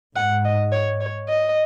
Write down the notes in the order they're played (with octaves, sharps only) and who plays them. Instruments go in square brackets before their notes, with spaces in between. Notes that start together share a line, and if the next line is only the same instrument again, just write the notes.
[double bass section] G#2 [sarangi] F#5
[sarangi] D#5
C#5
C#5
D#5